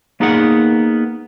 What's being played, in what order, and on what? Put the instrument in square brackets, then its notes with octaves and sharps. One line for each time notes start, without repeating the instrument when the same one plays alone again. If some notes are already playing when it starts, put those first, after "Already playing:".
[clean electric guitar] A#3 B3 D#4 G#4 A#4 F#5